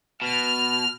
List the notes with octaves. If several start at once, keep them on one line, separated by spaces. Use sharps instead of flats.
B2 F6